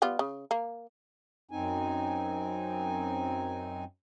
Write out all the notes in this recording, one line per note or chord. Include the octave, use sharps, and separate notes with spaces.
G3 B3 F4
C#3
A#3
F#2 C4 D#4 G#5